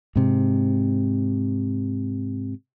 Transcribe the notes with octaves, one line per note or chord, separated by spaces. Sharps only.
G#2 C3